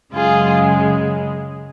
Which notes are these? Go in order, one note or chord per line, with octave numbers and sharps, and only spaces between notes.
F#2 C#3 G#3 F4 G#4